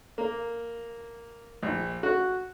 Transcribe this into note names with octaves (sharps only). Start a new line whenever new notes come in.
A#3
A#1
F#4